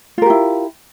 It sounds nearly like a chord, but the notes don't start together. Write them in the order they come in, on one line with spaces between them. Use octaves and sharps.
F4 A#4 G4 E4